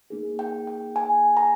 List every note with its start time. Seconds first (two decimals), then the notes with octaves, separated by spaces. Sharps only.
0.10 A#3 D#4 G#4
0.39 G5
0.67 G5
0.96 G#5
1.37 A#5